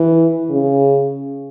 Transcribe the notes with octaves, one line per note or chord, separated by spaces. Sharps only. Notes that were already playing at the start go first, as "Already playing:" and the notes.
Already playing: E3
C#3